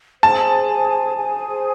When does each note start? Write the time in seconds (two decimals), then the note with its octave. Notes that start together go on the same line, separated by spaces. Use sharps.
0.23 G#4 C5 G#5 A5
1.16 G#4 C5 G#5